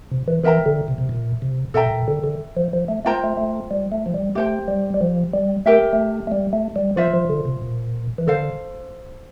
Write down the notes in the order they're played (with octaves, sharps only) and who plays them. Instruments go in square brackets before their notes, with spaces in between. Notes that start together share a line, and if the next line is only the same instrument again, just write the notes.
[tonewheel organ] C3
E3
[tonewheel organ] E3 [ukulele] A#4 E5 G5 A#5
[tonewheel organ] D3
C3
C3
A#2
C3
[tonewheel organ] A#2 [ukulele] A4 E5 G5 A#5
[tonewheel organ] A#2
D3
D3
F3
F3
A3
[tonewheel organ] A3 [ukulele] F4 C5 G5 A#5
[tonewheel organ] A3
A3
G3
A3
F3
G3
[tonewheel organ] A3 [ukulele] G4 C5 G5
[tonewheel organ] G3
G3
F3
G3
[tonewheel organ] A3 [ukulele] G4 A#4 E5 G5
[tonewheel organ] A3
A3
G3
A3
G3
[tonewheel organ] F3 [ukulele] F4 C5 E5
[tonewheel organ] F3
D3
C3
A#2
E3
[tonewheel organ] D3 [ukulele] A4 C5 F5